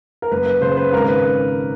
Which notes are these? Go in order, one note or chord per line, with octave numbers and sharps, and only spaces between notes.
A#4
F#1 B4
B4
C#3 C5
B4
G#1 A#4
B4